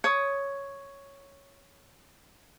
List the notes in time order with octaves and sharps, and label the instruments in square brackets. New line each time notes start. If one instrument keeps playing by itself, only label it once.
[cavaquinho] C#5 D#6